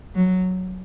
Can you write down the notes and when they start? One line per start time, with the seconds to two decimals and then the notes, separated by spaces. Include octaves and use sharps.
0.15 F#3